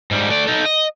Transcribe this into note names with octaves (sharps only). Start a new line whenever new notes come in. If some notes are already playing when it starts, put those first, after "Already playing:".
G#2 G3
A3 D5
D#4 A4
D#5